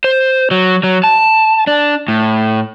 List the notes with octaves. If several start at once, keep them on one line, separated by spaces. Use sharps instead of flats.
C5
F#3
F#3
A5
D4
A2